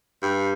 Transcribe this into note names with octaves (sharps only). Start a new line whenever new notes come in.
G2